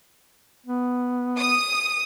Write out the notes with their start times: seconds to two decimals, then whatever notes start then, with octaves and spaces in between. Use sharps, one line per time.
0.66 B3
1.37 D#6